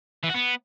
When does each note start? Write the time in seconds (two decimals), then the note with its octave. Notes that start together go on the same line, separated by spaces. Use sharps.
0.23 E3
0.29 F#4
0.34 B3